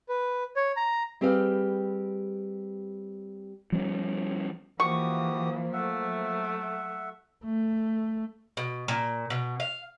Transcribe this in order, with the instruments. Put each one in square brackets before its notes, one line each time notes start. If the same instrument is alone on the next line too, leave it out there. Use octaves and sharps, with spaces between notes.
[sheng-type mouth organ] B4
C#5
A#5
[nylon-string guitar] G3 C4 G4 G#4 B4 F5
[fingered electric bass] F3 G3 B3 C#4
[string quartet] E3 [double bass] F3 A#3 [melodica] F#4 G4 D#6 [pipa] C#6
[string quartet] F#3 A3 [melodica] E5 F#5
[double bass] A3
[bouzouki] B2
A#2
B2
F5